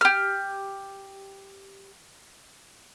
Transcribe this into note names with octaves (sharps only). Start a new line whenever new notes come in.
G4 F6